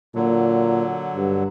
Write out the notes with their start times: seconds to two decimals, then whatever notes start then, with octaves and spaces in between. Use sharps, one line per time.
0.15 A#2 D3 F#3
1.15 G2